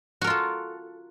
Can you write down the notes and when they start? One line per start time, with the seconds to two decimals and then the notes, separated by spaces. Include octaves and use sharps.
0.21 F#4
0.24 A#4
0.27 F4
0.30 A4